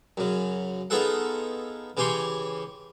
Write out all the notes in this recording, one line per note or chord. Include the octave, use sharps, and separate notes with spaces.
F#2 C#3
B3 D#4 F4 G#4 A4 F#5
C#3 E3 G4 G#5 C6 C#6